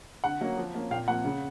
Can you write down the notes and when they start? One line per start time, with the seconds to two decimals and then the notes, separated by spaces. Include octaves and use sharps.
0.24 D3 F#5
0.41 F#3 A#3 C#4
0.57 F3
0.74 A#3 C#4
0.91 A#2 F5 G5
1.08 F3 A#3 F#5
1.25 C#3